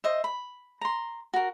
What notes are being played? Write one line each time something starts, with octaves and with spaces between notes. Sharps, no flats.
C5 D#5 E5
B5
A#5 C6
F#4 A#4